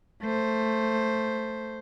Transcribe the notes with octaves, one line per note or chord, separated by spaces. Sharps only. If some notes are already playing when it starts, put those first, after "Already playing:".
A3 C5